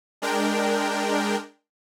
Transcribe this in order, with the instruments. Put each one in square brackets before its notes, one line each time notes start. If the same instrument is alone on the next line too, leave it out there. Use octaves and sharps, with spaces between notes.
[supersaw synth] G#3 D4 A#4 G5